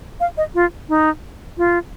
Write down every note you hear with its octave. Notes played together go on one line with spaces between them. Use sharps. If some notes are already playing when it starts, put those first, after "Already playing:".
F5
D#5
F4
D#4
F4